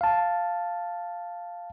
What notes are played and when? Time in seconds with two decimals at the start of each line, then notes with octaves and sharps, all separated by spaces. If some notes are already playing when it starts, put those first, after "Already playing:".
0.01 F5 A5